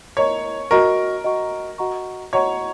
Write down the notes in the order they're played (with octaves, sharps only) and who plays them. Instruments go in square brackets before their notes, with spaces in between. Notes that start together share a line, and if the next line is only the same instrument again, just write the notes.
[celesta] A#4 D#5 A#5 C#6 [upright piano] C#5
[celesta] F#4 D#5 F#5 A#5 C#6 [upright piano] A#4
[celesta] F#4 D#5 F#5 A#5 C#6
F#4 D#5 F#5 A#5 C#6
[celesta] F#4 D#5 F#5 A#5 C#6 [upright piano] C#5